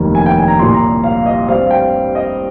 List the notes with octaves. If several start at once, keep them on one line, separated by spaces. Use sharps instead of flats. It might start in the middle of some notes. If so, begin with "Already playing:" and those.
Already playing: F1 D#2 D#3 A#3
G#5
G5
G#5
A#5
C2 A#2 G3 C6
A#5
F5
D#5
G2 G3 C4 F5
G5
D#5